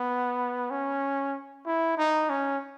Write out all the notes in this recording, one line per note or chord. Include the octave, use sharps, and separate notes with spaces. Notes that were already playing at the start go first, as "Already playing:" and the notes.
Already playing: B3
C#4
E4
D#4
C#4